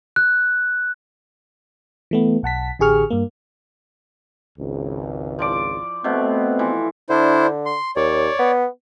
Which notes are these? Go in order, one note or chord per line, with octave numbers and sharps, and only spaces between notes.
F#6
E3 A3 B3
B1 F#5 A5 B6
A1 D3 G4 G#4 C#6 F6
G2 A#3
G#1 C#2
F3 D5 D6
B2 A3 B3 C4
E3 F3
D3 D4 E4 C5
C6
D#2 C#5 D5
B3